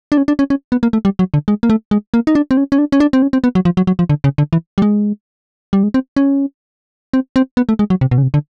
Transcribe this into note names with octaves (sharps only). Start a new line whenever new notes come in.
D4
C#4
D4
C#4
C#4
B3
A#3
A3
G3
F#3
D3
G#3
A#3
A3
G#3
A#3
D#4
D4
C4
C#4
C#4
D4
C#4
D4
C4
C#4
C4
B3
F#3
F3
F#3
F#3
F3
D3
C#3
D3
E3
G3
G#3
G3
G#3
C4
C#4
C4
C4
B3
A3
G#3
F#3
C3
B2
C#3
C3
D3